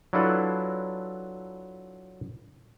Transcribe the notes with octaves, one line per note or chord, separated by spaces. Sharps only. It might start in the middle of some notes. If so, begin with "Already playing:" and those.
F#3 D4 E4 F4 A4 B4